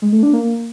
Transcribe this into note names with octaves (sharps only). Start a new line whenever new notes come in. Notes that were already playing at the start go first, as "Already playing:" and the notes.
G#3
A3
D4
A#3